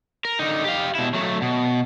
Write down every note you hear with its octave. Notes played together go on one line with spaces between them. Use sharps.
A#4
D3 D#4
G4 F5
B2 E4
F#3 A3
B2